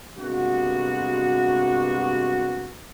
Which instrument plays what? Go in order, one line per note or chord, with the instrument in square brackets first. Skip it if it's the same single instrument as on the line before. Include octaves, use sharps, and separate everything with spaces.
[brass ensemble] G2 C3 G#3 A#3 B3 F#4